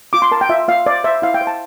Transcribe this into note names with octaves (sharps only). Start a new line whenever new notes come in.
F4 D6
C6
A#4 A5
G5
F4 E5
F4 F5
C5 D5
C5 E5
E4 F5
G5
C5
A5